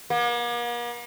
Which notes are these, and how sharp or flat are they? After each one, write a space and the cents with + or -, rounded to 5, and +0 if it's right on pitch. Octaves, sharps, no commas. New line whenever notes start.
A#3 +45